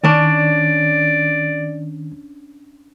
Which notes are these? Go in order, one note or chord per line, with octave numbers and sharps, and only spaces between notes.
D#3 C#4 D4 D5